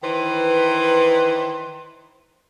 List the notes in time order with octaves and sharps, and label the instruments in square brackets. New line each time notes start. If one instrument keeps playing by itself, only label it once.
[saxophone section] D#3 E3 B4 C5